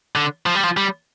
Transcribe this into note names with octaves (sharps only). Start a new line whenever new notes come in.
D3
F3
G3
F3
G3